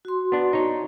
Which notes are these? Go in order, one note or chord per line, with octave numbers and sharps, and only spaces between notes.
F#4 C6
B3 D4
D#4 C#5